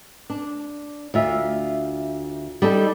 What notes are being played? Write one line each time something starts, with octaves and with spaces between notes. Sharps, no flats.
D4
D2 F4 E5
G3 D#4 G4 A4